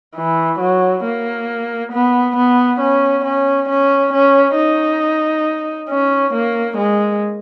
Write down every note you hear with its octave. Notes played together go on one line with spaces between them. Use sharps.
E3
F#3
A#3
B3
B3
C#4
C#4
C#4
C#4
D#4
C#4
A#3
G#3